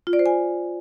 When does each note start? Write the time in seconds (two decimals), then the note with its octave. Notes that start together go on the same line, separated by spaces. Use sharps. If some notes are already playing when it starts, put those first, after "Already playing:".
0.07 F4
0.13 D5
0.19 C5
0.26 G#5